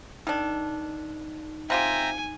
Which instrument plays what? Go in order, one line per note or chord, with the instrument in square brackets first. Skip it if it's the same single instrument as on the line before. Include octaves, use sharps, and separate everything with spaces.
[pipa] D#3 D4 [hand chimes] D#4
[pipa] C4 F4 G4 [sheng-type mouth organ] E5 G5 A#5 [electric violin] G#5